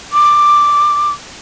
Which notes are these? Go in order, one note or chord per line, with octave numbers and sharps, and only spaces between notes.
D6